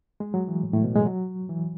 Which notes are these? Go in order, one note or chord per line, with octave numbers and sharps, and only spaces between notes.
G#3
F#3
E3
A2
A2
B2
G#3
F#3
E3